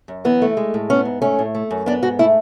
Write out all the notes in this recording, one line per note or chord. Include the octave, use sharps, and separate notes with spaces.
F#2
E3 B3
A3
G#3
A2
B3 C#4
G#2
A3 C#4
A2
A3
F#2
B3 D4
G#2 F#4
A3 E4